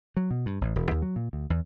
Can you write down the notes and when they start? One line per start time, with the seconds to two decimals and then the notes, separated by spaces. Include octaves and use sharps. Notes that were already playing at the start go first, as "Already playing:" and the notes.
0.17 F#3
0.31 B2
0.46 G2
0.61 A1
0.76 E1
0.91 D#2
1.02 F#3
1.16 A#2
1.33 D2
1.50 E2